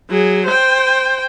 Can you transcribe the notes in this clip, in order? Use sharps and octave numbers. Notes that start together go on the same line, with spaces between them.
F#3 G#4
C5 G5